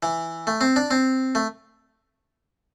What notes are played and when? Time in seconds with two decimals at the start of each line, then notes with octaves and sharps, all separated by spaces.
0.03 E3
0.47 A3
0.61 C4
0.76 D4
0.91 C4
1.35 A3